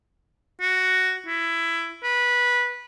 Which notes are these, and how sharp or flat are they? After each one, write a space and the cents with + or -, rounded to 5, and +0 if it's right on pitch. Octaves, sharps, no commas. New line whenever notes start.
F#4 +5
E4 +15
B4 -15